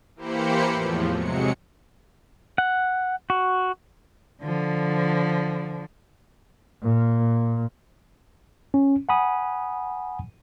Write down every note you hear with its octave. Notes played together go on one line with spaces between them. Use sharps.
E3 A#3 G4 C5 B5 C#7
E2 A2 F3
C3 F#3 G#3 C#7
F#5
F#4
D3 F3
A#2
C#4
F#5 G#5 B5 D#6